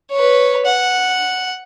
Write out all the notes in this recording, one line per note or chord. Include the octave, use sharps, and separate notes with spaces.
B4 C#5
F#5